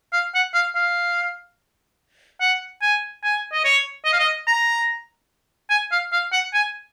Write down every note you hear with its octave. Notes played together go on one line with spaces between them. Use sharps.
F5
F#5
F5
F5
F#5
G#5
G#5
D#5
C#5
D#5
F5
D#5
A#5
G#5
F5
F5
F#5
G#5